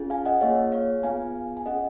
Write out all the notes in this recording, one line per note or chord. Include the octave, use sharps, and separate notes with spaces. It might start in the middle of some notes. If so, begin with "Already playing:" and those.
Already playing: C#4 F4 G#4
F5 G#5
D#5 F#5
A#3 F4 G#4 C#5 F5
C#5 F5
B3 F4 G#4 F5 G#5
G#5
C#4 G#4 D#5 F#5